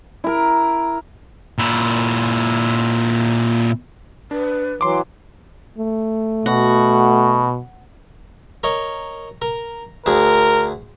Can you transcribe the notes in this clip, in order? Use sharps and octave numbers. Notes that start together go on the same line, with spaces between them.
E4 A#4
A#2 E4
D4 B4
E3 F#3 C6 D6
A3
B2 F#4
A#4 C#5 D#5
A#4
D2 G#4 A#4